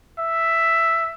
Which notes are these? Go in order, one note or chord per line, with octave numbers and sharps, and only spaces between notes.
E5